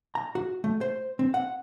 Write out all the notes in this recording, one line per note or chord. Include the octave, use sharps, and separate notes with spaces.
A#5
F#4
A3
C5
C4
F#5